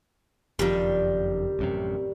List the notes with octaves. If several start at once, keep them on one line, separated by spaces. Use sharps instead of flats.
F#1 F2 D#3 F3 G3
A1 F#2 C3